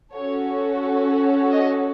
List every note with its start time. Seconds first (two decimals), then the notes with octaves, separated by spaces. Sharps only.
0.12 C#4 F#4 A4 C#5
1.51 D#5